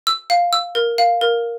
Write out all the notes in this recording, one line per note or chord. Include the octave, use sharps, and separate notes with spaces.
E6
F5
E6
A#4
F5
A#4